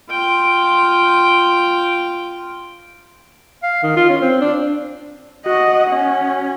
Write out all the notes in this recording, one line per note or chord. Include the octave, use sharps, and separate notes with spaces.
F4 G5
F5
D#3
F4
C#4
C4
D4
F#4 D#5 F#5
C#4